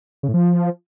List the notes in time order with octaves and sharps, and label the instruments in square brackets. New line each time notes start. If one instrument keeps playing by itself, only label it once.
[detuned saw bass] C#3
A2
F3